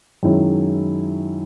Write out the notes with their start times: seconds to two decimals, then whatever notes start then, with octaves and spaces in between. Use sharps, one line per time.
0.23 F#2 D#3 G#3 C#4 E4